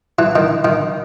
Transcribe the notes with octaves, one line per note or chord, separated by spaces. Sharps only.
E3
D#3
D#3